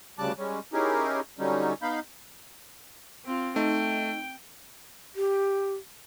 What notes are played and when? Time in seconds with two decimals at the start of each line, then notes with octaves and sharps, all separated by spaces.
0.19 D2 C#3 G3 A5 D6 F#6
0.38 G3 G#3 C#4
0.73 C#4 D#4 E4 G4 G#4 A#4
1.39 D3 F#3 G3 C#4 D#4
1.82 B3 D#4 F5 B5 G6
3.26 C4 F4
3.56 A3 D#4 G5
5.15 G4